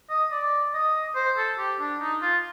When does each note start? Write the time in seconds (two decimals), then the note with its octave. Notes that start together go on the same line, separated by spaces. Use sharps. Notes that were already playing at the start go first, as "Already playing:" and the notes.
0.10 D#5
0.32 D5
0.74 D#5
1.16 C5
1.38 A4
1.59 G4
1.80 D4
2.01 D#4
2.22 F4